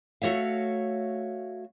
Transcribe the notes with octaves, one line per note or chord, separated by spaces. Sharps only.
A3 F#4 C#5 E5 F5